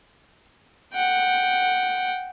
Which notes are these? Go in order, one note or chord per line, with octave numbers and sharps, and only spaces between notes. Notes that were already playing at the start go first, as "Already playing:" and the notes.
F#5 G5